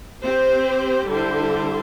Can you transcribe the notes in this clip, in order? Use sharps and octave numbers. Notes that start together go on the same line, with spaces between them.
C4 G4 C5
D3 G3 E4 C5